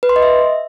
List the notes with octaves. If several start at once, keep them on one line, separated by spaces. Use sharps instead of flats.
B4
C6
D#5
E5